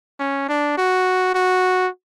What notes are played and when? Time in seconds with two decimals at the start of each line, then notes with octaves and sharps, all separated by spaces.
0.19 C#4
0.49 D4
0.77 F#4
1.35 F#4